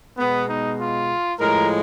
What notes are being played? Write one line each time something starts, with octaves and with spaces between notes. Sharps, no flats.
B2 G#3 B3
D#4
F4
A2 F3 G#3 A#4